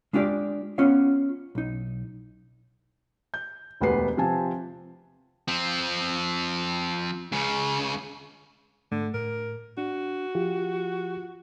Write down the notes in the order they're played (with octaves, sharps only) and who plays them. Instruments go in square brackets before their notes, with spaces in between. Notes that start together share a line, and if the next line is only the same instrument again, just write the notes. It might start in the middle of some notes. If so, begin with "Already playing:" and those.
[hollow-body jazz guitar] G#3 D4 F4 G4 C5 D5
B3 C#4 F4 C#5 F5
B1 D#4
[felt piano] G6
E1 D2 B3 G4 B4 C7
C3 F3 C4 G#5 A5
[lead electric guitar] F3 C4
C#2 C#3
[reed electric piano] G#2 A3 [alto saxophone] D3
[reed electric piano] A2 [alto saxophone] A#4
[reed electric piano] D4 [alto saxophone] F#4
[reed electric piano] F3 F4 G4